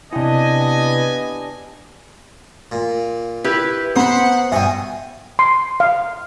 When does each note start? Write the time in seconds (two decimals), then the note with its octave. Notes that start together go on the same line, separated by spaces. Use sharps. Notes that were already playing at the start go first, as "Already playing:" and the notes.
0.13 C3 B3 D4 E4 G4 D#5 G5 G#5
2.72 A#2
3.44 E4 G4 B4
3.96 B3 C5 F#5 A#5 B5 D#6
4.52 G2 B2 D#5 E5 G5 G#5
5.39 C6
5.80 F5